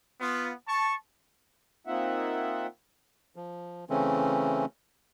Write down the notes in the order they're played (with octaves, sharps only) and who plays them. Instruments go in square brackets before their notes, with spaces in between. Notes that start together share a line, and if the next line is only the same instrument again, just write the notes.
[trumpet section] B3 F4
A5 C#6
[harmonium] A#3 C4 D#4 F4 E5 F#5
[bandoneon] F3
C#3 E3 A3 C4 C#4